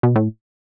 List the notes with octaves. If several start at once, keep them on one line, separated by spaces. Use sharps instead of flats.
B2
A2